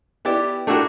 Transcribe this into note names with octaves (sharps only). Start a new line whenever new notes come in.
B3 E4 G4 D5
A3 D4 E4 F#4 G4 A#4